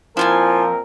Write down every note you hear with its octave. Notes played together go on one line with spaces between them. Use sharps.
A#2 F3 C4 E4 F4 A#4 G#5